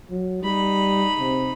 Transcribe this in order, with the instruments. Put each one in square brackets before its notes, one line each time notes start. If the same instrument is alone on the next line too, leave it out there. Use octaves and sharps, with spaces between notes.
[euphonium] F#3
[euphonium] G3 [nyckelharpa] D#4 B5
[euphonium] C3